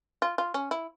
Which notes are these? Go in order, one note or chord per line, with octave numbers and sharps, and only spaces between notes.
F4
F4
C#4
E4